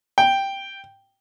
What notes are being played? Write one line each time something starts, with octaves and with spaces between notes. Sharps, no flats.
G5